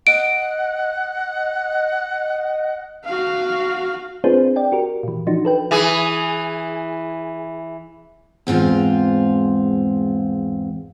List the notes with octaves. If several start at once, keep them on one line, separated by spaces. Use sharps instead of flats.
D#5 F#5 D7
F#4 F5
C4 D4 F4 G#4 B4 C5
D5 G5
F#4 G4 A#4
A#2 E3
F3 D4 D#4 F#4
A4 B4 G5
E3 G#4
E2 G#2 C4 F4